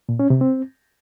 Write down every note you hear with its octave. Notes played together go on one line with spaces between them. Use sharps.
A#2
C#4
C3
C4